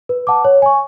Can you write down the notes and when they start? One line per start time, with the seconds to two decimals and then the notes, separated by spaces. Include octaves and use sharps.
0.09 B4
0.27 F#5 A5 D6
0.45 C#5
0.62 G#5 C#6